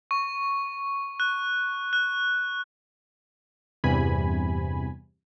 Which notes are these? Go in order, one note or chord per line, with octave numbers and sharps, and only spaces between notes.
C#6
F#6
F#6
E2 G2 C3 G#5 B5